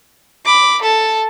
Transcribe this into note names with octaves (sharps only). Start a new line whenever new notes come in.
B5 D6
A4 A5